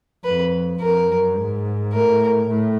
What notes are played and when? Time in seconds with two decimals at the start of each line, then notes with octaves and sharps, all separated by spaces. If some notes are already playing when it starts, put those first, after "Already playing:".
0.24 F2 B4
0.81 F2 A#4
1.08 F#2
1.37 G#2
1.93 A2 A#4
2.49 A2